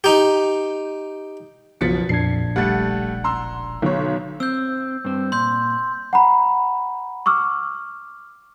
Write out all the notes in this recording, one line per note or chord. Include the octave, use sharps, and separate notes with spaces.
D#4 G4
F#1 B1 B2 F3 A6 B6 C#7
A#1 F2 D4 G#6 C7
E1 G3 A3 F#5 A6
A#5 C6 E6
B1 D3 C#5
C4 E6 G6
G2 C4
A#2 C6 G6
F#5 A#5 B5
C#6 D6 E6 F6